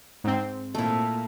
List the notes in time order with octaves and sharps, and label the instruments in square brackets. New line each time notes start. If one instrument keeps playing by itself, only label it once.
[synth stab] G#2 C4
[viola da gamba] A#2 [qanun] A3 E4